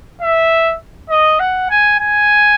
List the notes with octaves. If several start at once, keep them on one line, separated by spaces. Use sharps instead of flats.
E5
D#5
F#5
G#5
G#5